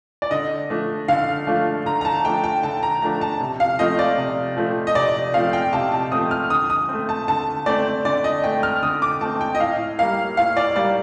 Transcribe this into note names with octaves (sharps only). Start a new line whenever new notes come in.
D5
D3 D#5
F3 A3 D4
D3 F5
F3 A3 D4
D3 A#5
A#5
A5
F3 A3 D4 G5
G5
D3 A5
A#5
F3 A3 D4 A#5
A5
C3
F5
F3 A3 C4 D#5
D5
C3
F3 A3 C4
D#5
C3 D5
F3 A3 C4 F5
G5
C3 A5
A5
F3 A3 C4 D#6
F6
D3 D#6
D#6
A3 C4
A5
D3 A5
A3 C4 D5
D3 D5
D#5
A3 C4 G5
F6
D3 D#6
D6
A3 C4 A5
G5
D#5
A2 F5
G3 A#3 F5
A2 F5
D5
G3 A#3 D5